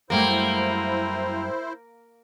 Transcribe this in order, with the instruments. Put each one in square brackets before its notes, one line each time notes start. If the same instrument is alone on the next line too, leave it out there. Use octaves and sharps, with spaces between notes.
[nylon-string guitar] F#2 G3 A3 [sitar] A#3 [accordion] E4 C5